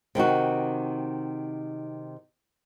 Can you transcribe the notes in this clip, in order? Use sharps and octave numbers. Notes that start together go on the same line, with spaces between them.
C3 D#3 D#4 F#4